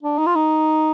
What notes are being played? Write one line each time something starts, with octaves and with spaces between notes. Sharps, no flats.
D4
D#4
F4
D#4